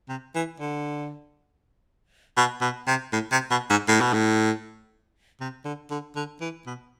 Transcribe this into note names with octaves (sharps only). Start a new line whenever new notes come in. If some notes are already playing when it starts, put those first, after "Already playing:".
C3
E3
D3
B2
B2
C3
A2
C3
B2
G#2
A2
B2
A2
C3
D3
D3
D3
E3
B2